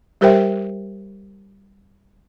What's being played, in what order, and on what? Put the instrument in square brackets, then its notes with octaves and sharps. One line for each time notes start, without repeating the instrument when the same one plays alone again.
[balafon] G3 G4 A#4 C5 E5 G5